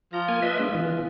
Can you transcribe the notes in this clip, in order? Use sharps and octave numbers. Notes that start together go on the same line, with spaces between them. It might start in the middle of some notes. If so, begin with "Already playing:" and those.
F3 A#5
A#3 G#5
F4 B4 D#5 E5
G#3 B3 D4
E3